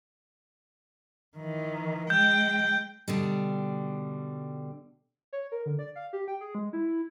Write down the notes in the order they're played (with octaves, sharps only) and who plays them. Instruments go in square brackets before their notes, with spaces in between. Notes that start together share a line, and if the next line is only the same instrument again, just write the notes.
[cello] D#3 E3
[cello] G#3 G5 [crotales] G6
[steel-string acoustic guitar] B2 D3 G3
[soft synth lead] C#5
A#4
D3
D5
F5
G4
G5
G#4
G#3
E4